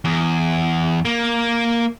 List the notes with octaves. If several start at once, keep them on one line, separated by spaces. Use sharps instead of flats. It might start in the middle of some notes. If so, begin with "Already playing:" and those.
E2
A#3